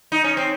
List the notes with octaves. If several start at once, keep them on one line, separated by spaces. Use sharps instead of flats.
D#4
C#4
C4